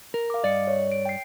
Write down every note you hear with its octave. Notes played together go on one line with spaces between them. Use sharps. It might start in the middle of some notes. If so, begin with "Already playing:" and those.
A#4
F5 D6
G2 D5 D#5 C#7
C#5
D7
G5 C7